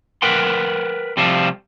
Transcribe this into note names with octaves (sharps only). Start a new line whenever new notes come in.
A#4 B4 F#5 G5 C6
C3 F3 G3 F4 A4